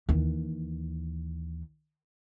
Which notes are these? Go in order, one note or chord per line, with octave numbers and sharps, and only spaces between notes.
D#2 E3